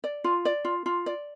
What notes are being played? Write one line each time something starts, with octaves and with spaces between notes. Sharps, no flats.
D5
F4
D5
F4
F4
D5